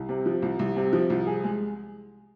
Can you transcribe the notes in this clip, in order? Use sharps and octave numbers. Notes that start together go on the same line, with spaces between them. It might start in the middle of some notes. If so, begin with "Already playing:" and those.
Already playing: C2
C3
F3
C2
C2
C3
F3
C2
G#4
G#3